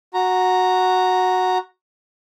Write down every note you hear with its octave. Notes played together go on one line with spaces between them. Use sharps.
F#4 A#5